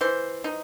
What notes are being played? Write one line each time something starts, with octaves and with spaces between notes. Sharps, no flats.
E3 C5
D#4